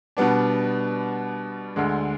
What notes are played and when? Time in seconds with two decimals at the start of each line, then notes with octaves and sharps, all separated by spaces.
0.17 B2 G3 B3 D4
1.76 D2 D3 G#3